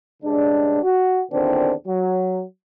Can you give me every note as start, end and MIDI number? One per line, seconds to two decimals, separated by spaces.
0.23 0.82 43
0.23 0.82 49
0.23 0.82 56
0.23 0.82 62
0.83 1.21 66
1.31 1.71 40
1.31 1.71 46
1.31 1.71 50
1.31 1.71 51
1.31 1.71 60
1.31 1.71 62
1.87 2.40 54